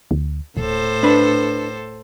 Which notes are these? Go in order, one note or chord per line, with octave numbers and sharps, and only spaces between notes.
D2
D1 A2 A4 C5
D4 B4